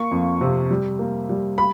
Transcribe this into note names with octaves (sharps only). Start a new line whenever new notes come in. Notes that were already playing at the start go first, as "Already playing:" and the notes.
Already playing: A#3 C#6
F2
C3
G3
A#3
G3
B5